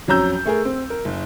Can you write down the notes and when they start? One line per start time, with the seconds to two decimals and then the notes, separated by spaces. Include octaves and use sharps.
0.08 F2 F#3 C#4 A#5 E6 G6
0.45 A3 G#4 A#4
0.65 C4
0.90 A#4
1.05 F#1